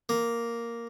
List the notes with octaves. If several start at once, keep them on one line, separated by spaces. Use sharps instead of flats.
A#3